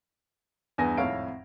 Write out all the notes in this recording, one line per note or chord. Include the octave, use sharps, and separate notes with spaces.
E2 G2 B3 G#5 A#6
G#1 F2 A2 C#5 F5 D7